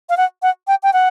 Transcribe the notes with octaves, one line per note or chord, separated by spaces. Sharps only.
F5
F#5
F#5
G5
G5
F#5